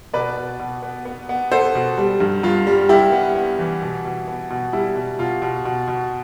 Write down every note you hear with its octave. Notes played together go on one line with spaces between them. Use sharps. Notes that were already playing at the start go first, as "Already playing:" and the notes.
B2 B4 D5
B2
B2
B3
B3
B3
B3 A4 C5
B2
G3
G2
G2 F4
G3
G3 E4 G4
B3
B3
E3
B2
B2
B3
B2
G3 E4
B2
B2 F4
B2
B2
B2